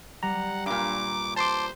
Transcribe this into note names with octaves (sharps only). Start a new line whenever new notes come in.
G3 F#5 A#5
G2 A#2 D6
C5 A5 C6 D6